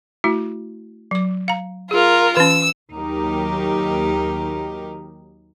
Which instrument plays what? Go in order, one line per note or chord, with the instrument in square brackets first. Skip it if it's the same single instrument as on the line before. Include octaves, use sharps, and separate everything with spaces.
[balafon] A3 E4 F#4
F#3 D6
F5 A#5
[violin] F4 A#4 [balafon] G#4
[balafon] E3 C#4 [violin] E6
[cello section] D#2 F#3 D#4 G4 A#4